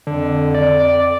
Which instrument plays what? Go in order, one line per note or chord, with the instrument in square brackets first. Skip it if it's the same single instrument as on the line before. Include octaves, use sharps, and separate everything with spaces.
[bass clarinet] F2 [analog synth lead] D3
[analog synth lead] D5